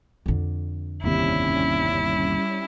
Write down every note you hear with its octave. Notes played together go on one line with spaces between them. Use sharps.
F2 D3
G1 D#2 C3 G3 C#4 E4